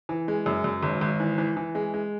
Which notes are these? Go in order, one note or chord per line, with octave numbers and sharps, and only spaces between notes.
E3
G#3
F#2
F#2
G#1
G#1
E3
E3
E3
G#3
G#3